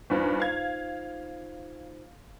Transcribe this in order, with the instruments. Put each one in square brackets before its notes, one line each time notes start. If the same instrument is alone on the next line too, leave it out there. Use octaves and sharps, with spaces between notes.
[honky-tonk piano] E2 G2 [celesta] D#4 F4 C5
[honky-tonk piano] F5 G#6